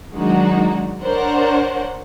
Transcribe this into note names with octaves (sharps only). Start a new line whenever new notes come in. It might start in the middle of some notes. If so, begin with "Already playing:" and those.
D#3 F#3 G#3 D4 D#4 F#4
D4 A#4 C5 C#5 F#5